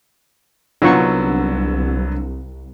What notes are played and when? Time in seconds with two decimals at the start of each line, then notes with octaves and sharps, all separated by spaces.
0.82 C2 D3 F#3 B3 D#4 F4 C#6